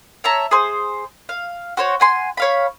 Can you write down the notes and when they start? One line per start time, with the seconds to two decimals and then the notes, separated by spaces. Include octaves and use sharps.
0.24 C#5 E5 A5 A#5
0.51 G#4 C5
1.29 F5
1.77 F#4 C5 C#5
2.00 F#5 G#5 C6
2.37 C#5 F5 B5